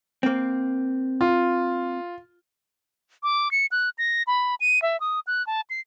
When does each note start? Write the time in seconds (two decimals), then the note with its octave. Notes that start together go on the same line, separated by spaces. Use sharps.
0.23 A#3 C4
1.21 F4
3.23 D6
3.51 C#7
3.71 F#6
3.98 A#6
4.27 B5
4.60 D#7
4.82 E5
5.00 D#6
5.27 F#6
5.47 A5
5.70 C7